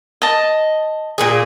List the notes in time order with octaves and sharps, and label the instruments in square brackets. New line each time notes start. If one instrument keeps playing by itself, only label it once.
[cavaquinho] D#5 A5
[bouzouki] A#2 A#3 G#4